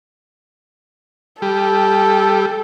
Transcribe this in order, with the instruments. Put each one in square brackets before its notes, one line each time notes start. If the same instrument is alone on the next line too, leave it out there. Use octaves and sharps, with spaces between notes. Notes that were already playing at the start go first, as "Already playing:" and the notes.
[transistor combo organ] G3 [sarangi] A4